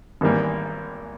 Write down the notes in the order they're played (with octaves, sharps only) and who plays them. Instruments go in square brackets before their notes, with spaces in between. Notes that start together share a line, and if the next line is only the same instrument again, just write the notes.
[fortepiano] G#1 G#2 E3 G3 A#3